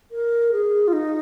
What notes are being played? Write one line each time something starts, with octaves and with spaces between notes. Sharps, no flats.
A#4
G#4
F4
D#4